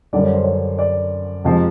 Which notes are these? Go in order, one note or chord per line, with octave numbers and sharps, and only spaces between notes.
F#2 D3 G3 D5
C#5
C5
C#5
D5
F2 C3 F3 G#3